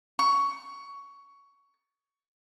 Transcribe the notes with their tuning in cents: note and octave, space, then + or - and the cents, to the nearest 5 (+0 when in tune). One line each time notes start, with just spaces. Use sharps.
C#6 +15